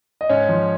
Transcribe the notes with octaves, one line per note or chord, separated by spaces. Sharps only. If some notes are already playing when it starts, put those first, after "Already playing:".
D#5
G#2 C#4 C#5
F3